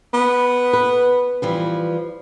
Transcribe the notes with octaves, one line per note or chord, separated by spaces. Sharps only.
B3
B4
E3 F3 G3